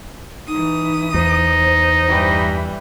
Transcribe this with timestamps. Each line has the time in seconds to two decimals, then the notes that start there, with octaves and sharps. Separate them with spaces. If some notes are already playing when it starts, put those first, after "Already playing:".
0.48 E3 D#4 D#6
1.14 E2 D#4 C5
2.07 G2 E3 G3